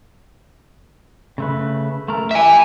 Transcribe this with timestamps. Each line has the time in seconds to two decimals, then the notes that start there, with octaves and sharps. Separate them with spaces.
1.38 C#3 A3 B4
2.08 A3 A#4
2.31 G4 E5 G#5